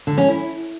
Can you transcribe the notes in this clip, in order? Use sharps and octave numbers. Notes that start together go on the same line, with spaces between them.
D3
C#4
E4